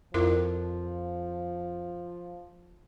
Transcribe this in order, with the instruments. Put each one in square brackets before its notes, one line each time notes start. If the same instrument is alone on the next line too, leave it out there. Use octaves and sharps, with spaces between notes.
[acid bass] F2 [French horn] F3 [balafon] E4 F4 A#4